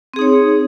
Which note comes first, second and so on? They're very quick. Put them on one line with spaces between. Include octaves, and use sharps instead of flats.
C4 G#4 D#4 C#5